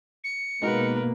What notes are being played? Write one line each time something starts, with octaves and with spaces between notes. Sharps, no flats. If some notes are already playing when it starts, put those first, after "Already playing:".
C#7
B2 G#3 A#3 D#4 F#4 A#4 B4